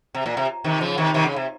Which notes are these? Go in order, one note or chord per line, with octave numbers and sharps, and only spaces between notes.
C3
A#2
C3
C3 D#3
C#3 F3
C3 D#3
C3 D#3
C#3
C3